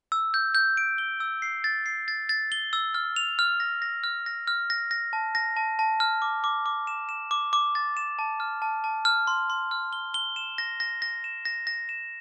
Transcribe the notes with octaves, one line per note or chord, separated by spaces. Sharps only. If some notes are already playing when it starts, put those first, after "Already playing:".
E6
G6
G6
D7
G7
E6
C7
A6
C7
A6
A6
G7
E6
F6
F7
F6
A#6
A#6
F6
A#6
F6
A#6
A#6
A5
A#6
A5
A5
F6
D6
D6
D6
E7
E7
D6
D6
A6
E7
A5
F6
A5
A5
F6
C6
C6
F6
G7
G7
E7
A#6
A#6
A#6
E7
A#6
A#6
E7